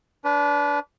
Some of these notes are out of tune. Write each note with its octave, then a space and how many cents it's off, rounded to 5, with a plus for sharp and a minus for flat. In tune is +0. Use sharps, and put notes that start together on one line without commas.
D4 -25 B4 +0